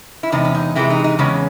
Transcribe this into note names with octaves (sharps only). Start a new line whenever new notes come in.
E4
E2 C3 G#3 D#4
C#4
D#4
C3 E3 G#3 E4
D#4
D#4
E2 C#3 G#3 C#4